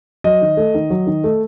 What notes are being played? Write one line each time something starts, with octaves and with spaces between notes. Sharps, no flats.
F#3 D#5
D#3
A3
D#3
F#3
D#3
A3